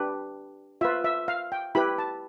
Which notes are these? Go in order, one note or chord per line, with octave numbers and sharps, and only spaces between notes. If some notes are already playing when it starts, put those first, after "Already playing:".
Already playing: D4 G4 B4
F4 B4 E5
E5
F5
G5
E4 G4 B4 B5
A5